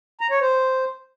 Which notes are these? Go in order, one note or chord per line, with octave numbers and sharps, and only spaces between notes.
A#5
C#5
C5